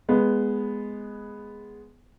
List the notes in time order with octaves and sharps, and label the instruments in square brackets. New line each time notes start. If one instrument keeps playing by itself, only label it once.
[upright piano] G#3 B3